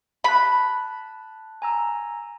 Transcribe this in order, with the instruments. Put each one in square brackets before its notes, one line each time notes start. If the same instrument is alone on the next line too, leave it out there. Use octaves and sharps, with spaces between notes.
[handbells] A5 F#6 [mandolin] B5
[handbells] G#5 A#5 E6